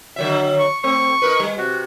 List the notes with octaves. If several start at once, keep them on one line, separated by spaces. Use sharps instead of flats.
D3 F#3 E5
C#6
A3 C4 C#6
D#4 A#4 B4
G3
C3 F#4